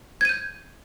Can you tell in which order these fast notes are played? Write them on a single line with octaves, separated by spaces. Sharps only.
G#6 D#7 G6